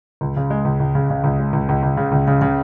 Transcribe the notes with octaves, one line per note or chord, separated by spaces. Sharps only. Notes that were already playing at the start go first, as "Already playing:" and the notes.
C#2
C#3
G#3
C#2
C#2
C#3
C#3
C#2
G#3
C#2
C#2
C#2
C#3
C#2
C#3
C#3